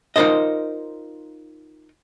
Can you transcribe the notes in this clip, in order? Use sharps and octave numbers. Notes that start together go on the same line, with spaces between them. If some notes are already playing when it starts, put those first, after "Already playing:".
D#4 F4 A#4 C5 D#5